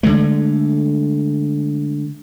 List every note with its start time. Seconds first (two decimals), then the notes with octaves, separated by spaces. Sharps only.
0.03 D3 F3 G#3 A3